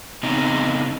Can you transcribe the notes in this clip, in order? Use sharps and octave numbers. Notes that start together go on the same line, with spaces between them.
C#3 B3 C4 D#4 D#5 A#5